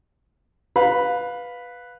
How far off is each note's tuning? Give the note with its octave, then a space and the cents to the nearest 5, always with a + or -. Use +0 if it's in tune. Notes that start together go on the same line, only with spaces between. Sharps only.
B4 +0 F5 +20 B5 +0